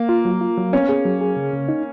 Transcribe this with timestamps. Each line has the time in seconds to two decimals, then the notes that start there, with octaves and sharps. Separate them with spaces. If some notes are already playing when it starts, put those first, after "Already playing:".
Already playing: A#3
0.09 F4
0.25 F#3
0.41 F4
0.57 F#3
0.72 B3 C#4
0.89 G#4
1.05 F#3
1.21 G#4
1.37 C#3
1.53 C#3
1.69 D#4